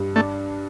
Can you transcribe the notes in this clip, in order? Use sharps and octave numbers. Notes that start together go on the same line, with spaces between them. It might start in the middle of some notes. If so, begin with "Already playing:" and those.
Already playing: G2
A3 D4